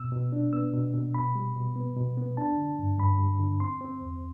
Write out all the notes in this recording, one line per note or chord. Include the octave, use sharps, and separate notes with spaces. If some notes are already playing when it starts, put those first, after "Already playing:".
Already playing: B2 E6
B2
D4
B3 E6
B2
B2
B2 B5
G3
B2
B3
B2
B3
D4 A5
D3
G2
G2 B5
G3
D3
C4 C6
C4
E2